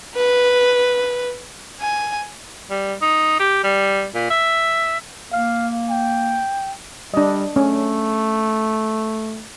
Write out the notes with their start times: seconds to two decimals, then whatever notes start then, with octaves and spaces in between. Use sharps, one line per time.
0.15 B4
1.81 G#5
2.70 G3
3.02 D#4
3.40 G4
3.64 G3
4.14 A#2
4.30 E5
5.32 A#3 F5
5.90 G5
7.14 G3 D4 D#5
7.56 A3 C#4